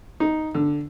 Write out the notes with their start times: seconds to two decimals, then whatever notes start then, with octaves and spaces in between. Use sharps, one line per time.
0.20 D#4
0.54 D3